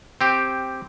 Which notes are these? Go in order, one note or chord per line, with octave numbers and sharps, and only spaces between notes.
C4 G4